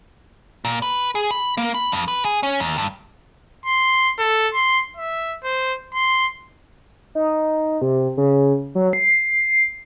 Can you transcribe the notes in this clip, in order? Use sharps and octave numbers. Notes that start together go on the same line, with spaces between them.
A#2
B4
G#4
B5
A#3
B5
F2
B4
G#4
C#4
D#2
G2
C6
A4
C6
E5
C5
C6
D#4
C3
C#3
F#3
C7